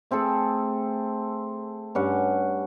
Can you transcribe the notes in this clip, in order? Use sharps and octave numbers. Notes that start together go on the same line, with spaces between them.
A3 C4 G#4 A4
G2 C#4 F#5